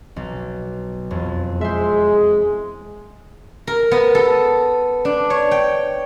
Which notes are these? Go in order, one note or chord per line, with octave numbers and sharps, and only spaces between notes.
B1
E1 F2
G#3 C5 E5
A#4
B3
A4
D4
C#5
G5